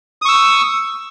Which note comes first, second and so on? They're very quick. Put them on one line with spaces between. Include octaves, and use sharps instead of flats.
D#6 C#6 E6